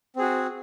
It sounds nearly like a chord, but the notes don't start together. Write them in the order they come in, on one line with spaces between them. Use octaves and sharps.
C4 G#4 F#4